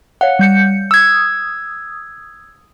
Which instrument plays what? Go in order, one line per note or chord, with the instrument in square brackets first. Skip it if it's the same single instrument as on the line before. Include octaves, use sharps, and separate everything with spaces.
[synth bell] C#5 F5 [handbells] F#5
[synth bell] G3 G6 C#7
[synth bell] D#6 [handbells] E6 G#6